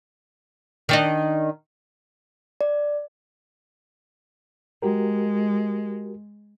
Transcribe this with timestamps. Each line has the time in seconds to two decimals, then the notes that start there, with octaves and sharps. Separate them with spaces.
0.89 D#3 D4 D#4
2.61 D5
4.82 G#3 F#4 G4 A#4